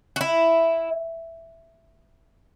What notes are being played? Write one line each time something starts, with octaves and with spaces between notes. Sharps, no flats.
F#4
E4